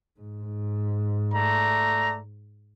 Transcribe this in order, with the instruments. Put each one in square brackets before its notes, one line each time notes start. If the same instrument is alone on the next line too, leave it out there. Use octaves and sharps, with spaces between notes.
[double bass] G#2
[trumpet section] A3 D5 A#5